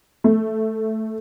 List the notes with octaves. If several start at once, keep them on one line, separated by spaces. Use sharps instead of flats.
A3